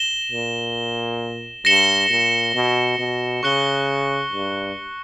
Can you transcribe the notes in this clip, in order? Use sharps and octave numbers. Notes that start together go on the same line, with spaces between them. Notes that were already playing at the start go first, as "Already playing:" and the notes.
Already playing: A#6 E7 G7
A#2
G2 A#6 C#7 E7 G7
A#2
B2
B2
C#3 C#6 F#6 C#7 G7
G2